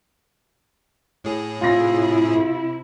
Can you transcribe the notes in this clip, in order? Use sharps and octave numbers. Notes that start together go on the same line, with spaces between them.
A2 G#4
C3 E4 F4 A#6